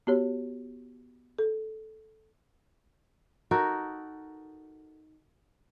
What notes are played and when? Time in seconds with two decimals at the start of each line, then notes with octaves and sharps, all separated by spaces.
0.07 B3 F#4 G4 C#5
1.39 A4
3.51 D#4 F#4 A4 A#4